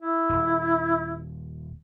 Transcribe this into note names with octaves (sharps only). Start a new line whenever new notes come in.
E4
D#1